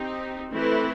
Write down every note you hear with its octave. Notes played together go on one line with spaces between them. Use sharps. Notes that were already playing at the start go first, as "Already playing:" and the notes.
Already playing: C4 D#4 G4
E3 A3 C4 E4 B4